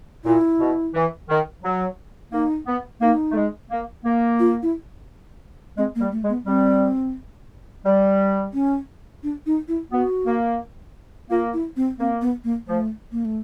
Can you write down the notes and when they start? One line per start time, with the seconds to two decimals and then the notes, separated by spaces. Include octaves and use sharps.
0.25 A#2 E4
0.60 B2
0.94 E3
1.29 D#3
1.63 F#3
2.32 A#3 D#4
2.67 B3
3.01 A#3 D#4
3.32 A3
3.36 G#3
3.71 A#3
4.05 A#3
4.40 F4
4.63 E4
5.77 G#3 C4
5.95 A#3
6.01 G3
6.12 A3
6.24 G#3
6.29 B3
6.46 G3 C4
7.85 G3
8.53 C#4
9.23 D4
9.46 D#4
9.68 E4
9.92 B3 F#4
10.26 A#3
11.30 A#3 F4
11.53 E4
11.76 C4
11.99 A#3 C4
12.22 B3
12.44 A#3
12.67 F3 A3
13.12 A#3
13.25 A3